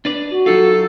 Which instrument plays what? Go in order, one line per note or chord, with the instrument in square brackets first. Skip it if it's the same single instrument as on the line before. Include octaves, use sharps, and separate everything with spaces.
[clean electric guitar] D4 B4 D5
[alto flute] F#4
[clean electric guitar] F#3 D#4 F4 [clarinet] A4